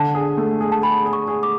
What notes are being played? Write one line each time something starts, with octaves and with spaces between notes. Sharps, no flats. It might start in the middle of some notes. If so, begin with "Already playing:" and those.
Already playing: D3 A5
G#4
A3
G#4
A5
G#4 B5
G#4
C#6
G#4
D6